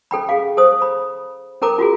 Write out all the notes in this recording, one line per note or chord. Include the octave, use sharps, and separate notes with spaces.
C#4 A4 G5 B5
G#4 F5
A4 C5 D#6
B5
C#4 A4 A#4 A#5 D6
F4 F#4 G#4